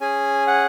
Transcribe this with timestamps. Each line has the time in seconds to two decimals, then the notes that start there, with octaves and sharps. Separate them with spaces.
0.01 C#4 G#4 G#5
0.47 F#5